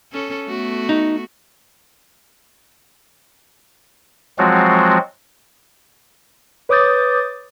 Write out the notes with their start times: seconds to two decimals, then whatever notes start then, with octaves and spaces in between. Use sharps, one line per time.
0.12 C#4 A4
0.47 A3 B3 F#4
0.89 D#4
4.38 F3 F#3 G#3 C4 F4 F#4
6.69 B4 C#5 D6 D#6 G6 A6